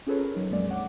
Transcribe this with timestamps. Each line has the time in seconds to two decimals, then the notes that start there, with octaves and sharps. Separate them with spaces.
0.07 C#4 F4 G#4 A4 B4 C#5
0.19 A#4
0.34 G1 F#3 D#4
0.51 A#1 F2 F#3 G#3 A#3 D5
0.68 C#5 F#5 D6